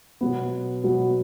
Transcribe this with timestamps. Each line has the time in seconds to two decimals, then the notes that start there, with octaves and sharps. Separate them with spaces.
0.21 B2 F#3 B3
0.84 B2 F#3 B3